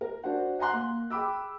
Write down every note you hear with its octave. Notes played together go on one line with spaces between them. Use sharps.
A#4
D4 F#4 C5 F#5
F#5 G#5 A#5 C6 F#6
A#3
G#4 G5 B5 D6 E6